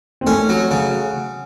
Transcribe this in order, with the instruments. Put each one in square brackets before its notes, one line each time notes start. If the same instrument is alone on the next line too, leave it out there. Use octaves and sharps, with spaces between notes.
[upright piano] C4
[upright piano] A3 [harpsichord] C#4
[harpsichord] F#3
C#3